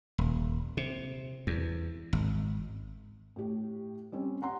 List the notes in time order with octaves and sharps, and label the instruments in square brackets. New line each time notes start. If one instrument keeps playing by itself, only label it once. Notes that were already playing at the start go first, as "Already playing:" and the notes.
[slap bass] D#1
C3
E2
G#1
[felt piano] A2 G4
G3 C4 C#4
F#5 A#5 C6